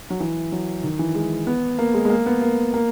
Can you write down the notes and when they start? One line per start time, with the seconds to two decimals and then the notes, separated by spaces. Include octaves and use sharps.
0.10 F#3
0.20 E3
0.52 F#3
0.83 D#3
0.99 E3
1.15 G#3
1.47 B3
1.79 A#3
1.94 G#3
2.05 G#3
2.10 A#3
2.26 B3
2.42 A#3
2.74 A#3